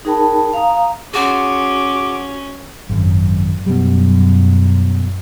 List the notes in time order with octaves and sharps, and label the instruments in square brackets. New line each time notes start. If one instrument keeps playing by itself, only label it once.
[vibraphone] D#4 G#4 A#4 G5 A5 B5
F5 A#5 D#6
[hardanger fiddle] C#4 [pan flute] F#4 [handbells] G#4 F#5 C6 [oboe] D6
[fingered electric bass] G#1 [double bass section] F#2
[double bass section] F#2 [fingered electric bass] B2 G3